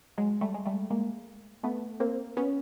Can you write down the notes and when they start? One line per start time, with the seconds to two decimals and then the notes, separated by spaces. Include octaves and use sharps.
0.18 F#3 G#3
0.41 G3 A3
0.54 G#3
0.65 G3 A3
0.90 G#3 A#3
1.63 A3 B3
2.00 A#3 C4
2.37 B3 C#4